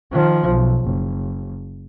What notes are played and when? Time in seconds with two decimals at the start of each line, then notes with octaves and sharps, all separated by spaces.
0.12 D#3 F3
0.48 B1
0.84 F#1